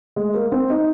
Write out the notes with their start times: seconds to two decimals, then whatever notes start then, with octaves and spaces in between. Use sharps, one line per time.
0.16 G#3
0.34 A#3
0.52 C4
0.70 D#4